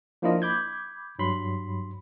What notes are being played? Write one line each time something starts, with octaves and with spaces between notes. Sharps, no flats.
F3 A#3 D4 E4 F4 D#5
B5 D6 G6 G#6
G2 F#3 B5 C6